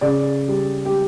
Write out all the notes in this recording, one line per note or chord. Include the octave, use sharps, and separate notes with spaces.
C#3 D5
G3
G4